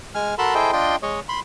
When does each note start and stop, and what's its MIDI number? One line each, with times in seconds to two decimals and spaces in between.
0.15 0.35 56
0.15 0.35 80
0.15 0.35 89
0.38 0.55 66
0.38 0.55 69
0.38 0.55 70
0.38 0.55 81
0.38 0.55 83
0.38 0.55 84
0.55 0.71 64
0.55 0.71 68
0.55 0.71 69
0.55 0.71 72
0.55 0.71 75
0.55 0.71 79
0.73 0.96 62
0.73 0.96 65
0.73 0.96 75
0.73 0.96 79
0.73 0.96 84
1.03 1.20 56
1.03 1.20 73
1.03 1.20 75
1.29 1.40 83
1.29 1.40 84